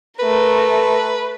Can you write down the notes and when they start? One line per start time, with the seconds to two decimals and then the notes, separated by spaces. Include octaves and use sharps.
0.19 A3 A#4 B4